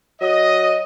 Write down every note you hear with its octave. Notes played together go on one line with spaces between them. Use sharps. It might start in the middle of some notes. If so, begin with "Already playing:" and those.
F#3 D#5